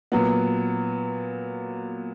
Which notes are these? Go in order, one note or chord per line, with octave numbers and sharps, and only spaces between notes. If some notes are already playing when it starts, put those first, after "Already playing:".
A#2 F#3 B3